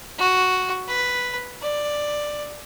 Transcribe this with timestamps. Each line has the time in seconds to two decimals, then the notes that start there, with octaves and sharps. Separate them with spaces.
0.18 F#4
0.88 B4
1.62 D5